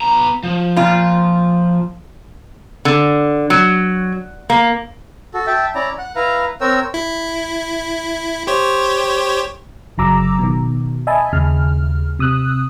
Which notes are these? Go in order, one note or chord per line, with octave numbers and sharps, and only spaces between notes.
B3 A#5
F3
A#2 F4
D3
F#3
A#3
F#4 A4
E5 G5 A5
C#4 E4 D5 A#5
F#5
E4 B4 F5 A#5
C4 A#4 C#5 G5 E6
E4
G4 C5 C#5
G1 C#3 F#3 A#5 D6 E6
B2 D#3
D#5 E5 G#5 A5 B5
D#2 C#3 F6
C3 D#6 E6 F#6